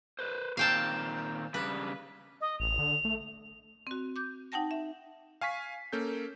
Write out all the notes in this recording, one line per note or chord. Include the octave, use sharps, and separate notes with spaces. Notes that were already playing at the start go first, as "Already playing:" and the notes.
B4 C5
A#2 D#3 C4 F5 G5 A5
C#3 G3 D4 B4
D#5
A1 F7
D3
A3
C4 F#4
D6 G6
D#4 F#5 G5 A5 A#6
E5
F5 G#5 C#6 B6
A#3 C#4 A4 G6